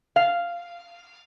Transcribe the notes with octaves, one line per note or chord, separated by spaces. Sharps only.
F5